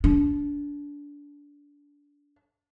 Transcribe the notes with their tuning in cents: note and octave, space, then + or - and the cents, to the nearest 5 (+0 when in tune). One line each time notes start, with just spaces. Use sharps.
D4 -25